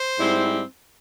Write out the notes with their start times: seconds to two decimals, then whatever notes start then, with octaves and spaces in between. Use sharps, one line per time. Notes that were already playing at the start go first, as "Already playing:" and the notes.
Already playing: C5
0.19 G#2 G3 C4 E4